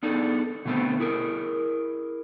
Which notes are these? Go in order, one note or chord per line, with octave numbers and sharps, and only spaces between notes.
B3 D4 D#4 G#4 A4
B2 D3 G#3 A3 B3 C4
E4 G#4 A#4